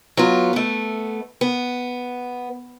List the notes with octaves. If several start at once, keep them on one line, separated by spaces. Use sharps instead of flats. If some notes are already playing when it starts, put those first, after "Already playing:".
F#3 B3 F4
A3 B3
B3